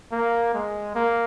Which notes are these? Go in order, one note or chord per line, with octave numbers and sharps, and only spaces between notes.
A#3
G#3
A#3